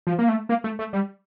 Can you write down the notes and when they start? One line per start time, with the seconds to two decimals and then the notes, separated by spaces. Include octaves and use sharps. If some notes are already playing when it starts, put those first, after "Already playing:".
0.07 F3
0.19 A#3
0.29 A3
0.49 A#3
0.64 A3
0.79 A3
0.93 G3